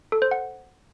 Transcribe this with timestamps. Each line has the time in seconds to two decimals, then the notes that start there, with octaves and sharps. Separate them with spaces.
0.12 A4
0.22 C5
0.31 F#5